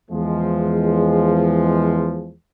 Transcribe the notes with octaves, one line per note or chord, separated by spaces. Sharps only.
E2 F3 G#3